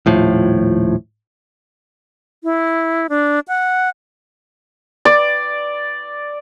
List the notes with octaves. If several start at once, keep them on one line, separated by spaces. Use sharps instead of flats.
D#1 A2 F3
E4
D4
F#5
D5